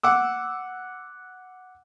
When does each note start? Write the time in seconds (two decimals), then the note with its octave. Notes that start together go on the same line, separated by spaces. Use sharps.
0.03 F#5 D6 E6